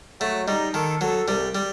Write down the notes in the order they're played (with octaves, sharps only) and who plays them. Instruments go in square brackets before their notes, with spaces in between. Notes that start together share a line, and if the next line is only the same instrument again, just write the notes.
[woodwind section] F#3 [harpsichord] A3
[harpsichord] G3 [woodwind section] D#4
[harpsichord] D#3 [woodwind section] A4
[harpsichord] F#3 [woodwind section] A4
[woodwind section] C2 [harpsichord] G3
[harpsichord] G3